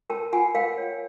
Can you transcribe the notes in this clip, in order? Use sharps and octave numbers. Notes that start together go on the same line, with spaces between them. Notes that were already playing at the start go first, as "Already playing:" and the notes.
A#4 G5 A5
F4 F#5 G#5
A#4 F5 G5
C#5